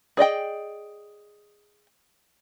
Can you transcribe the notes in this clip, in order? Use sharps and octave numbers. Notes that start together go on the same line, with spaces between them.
G#4 D5 D#5 G5